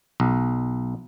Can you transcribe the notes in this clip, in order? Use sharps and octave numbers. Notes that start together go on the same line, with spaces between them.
B1